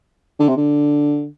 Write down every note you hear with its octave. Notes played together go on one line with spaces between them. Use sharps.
D3
C3
D3